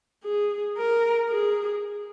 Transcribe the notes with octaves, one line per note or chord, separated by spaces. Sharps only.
G#4
A#4
G#4